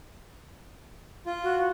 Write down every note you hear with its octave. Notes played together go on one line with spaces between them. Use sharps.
F4
F#4